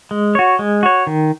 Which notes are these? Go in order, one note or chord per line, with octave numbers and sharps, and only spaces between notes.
G#3
F#4 C#5
G#3
F#4 C#5
D#3